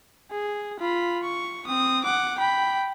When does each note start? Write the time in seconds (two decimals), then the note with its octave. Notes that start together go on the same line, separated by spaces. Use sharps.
0.31 G#4
0.80 F4 B5
1.23 C#6
1.67 C4 D#6
2.04 F#5 D6
2.38 G5 B5